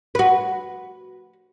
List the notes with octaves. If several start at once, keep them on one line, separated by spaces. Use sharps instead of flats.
F#4 B4